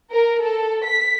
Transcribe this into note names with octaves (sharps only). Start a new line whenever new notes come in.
A#4
A4
B6